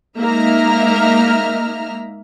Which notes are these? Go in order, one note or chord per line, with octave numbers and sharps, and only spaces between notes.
G#3 A#3 D#4 E5 A#5 F6